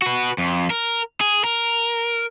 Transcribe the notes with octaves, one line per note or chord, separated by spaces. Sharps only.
F#4 B4
F2
A#4
G#4
A#4